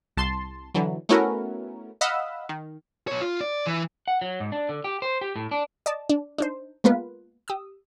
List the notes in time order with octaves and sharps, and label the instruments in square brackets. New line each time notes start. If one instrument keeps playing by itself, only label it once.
[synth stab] C2 A5 C6
D3 E3 F#3
A3 B3 C#4 E4 F#4 A#4
D#5 F5 F#5 B5 E6
D#3
[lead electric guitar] B2 C#5
F4
D5
E3
[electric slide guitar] F#5
F#3
G#2
D4
D3
G4
C5
G4
A2
D4
[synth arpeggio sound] D5 D#5 A5
D4
D4 D#4 C5
G#3 A#3 B3 F4 B4
G4 D#6 E6